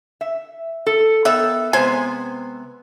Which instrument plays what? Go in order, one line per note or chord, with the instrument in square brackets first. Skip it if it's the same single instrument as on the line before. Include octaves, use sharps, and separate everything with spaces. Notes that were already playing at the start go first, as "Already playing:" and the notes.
[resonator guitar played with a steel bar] E5
A4
[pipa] D#3 E5 [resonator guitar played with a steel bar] B3 A4
[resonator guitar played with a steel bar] C3 G#3 B3 [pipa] C5 G#5